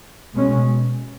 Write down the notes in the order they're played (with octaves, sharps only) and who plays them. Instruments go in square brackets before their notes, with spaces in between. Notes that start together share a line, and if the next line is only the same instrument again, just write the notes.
[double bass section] B2 G#3 C#4